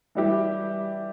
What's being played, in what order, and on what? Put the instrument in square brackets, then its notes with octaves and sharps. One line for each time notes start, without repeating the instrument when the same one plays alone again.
[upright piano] E3 G3 E4 G4